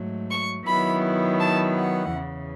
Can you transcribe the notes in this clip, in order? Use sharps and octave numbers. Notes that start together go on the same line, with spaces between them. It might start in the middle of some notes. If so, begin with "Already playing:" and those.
Already playing: G#2 F#3 A3
C#6
D#3 F#3 B3 E4 B5
A5
F#5
E2 C#3 E3